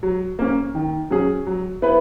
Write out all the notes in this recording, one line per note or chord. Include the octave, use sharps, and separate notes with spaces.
F#3
A#3 C#4
D#3
F#3 C#4 G#4
F#3
B3 E4 B4